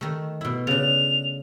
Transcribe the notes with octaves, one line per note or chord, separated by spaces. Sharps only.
D#3 A3
B2 E4
C#3 D4 F7